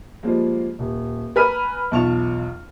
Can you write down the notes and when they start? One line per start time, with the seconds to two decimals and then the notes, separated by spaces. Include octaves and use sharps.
0.23 F3 G3 G#3 A#3
0.79 D#1
1.36 B4 G#5 A#5 F6 B6 D#7
1.91 B1 E2 F4 A5 C#6 F7